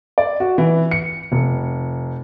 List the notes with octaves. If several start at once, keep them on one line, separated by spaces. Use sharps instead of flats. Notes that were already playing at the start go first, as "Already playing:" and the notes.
D5
F#4
E3
C#7
F1